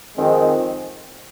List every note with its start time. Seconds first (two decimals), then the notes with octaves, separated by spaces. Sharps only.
0.17 F2 D#3 G#3 C4